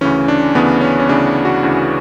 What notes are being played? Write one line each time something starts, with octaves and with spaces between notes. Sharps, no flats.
D2 C#3 E3 C#4
D4
D2 C#3 E3 B3
C#4
C#4
D2 C#3 E3 D4
F#4
D2 C#3 E3